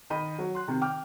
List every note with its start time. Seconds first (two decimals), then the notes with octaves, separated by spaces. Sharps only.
0.10 D#3 D#5 B5 D#7
0.39 F#3
0.55 C6 F#6
0.68 C3 D#3
0.81 G5 D6 F6